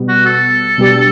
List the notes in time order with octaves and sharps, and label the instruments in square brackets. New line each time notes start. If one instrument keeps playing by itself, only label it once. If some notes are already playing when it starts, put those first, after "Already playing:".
Already playing: [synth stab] B2 G3 B3
[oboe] F#4
A4
[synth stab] B2 G3 D4 G4